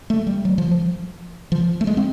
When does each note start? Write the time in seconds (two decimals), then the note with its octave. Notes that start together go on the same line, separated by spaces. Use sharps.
0.10 A3
0.27 G3
0.45 F#3
0.58 F3
0.71 F3
1.52 F3
1.81 A3
1.87 G#3
1.97 C4